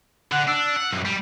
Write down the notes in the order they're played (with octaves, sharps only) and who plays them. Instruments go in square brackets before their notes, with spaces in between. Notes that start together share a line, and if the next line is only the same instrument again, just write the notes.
[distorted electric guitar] D3 [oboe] F#5
[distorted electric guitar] D4 [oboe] E6
[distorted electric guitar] F#5
B1 F#2
G3